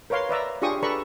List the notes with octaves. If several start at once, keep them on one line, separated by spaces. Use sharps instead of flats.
A#4 B4 C#5 F5 C6
B4 D5 E5 A#5
D4 F4 G4 G#4 C#6 D#6
A4 B4 D5 A#5 B5 C#6